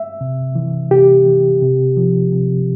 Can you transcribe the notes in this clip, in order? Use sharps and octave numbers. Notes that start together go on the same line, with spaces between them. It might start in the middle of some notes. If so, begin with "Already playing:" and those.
Already playing: E5
C3
E3
C3 G4
E3
C3
F3
C3